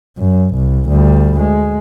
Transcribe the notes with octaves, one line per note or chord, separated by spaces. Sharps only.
F#2
C2
D2 G3
G#3